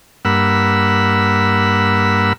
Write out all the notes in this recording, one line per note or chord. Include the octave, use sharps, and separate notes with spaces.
G2 A#3 F#5 B5 E6